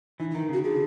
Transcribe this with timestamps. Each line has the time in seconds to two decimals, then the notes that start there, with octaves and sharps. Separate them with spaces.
0.20 E3 D#4
0.31 D#4
0.35 D#3
0.49 C#3 F#4
0.64 D3 G#4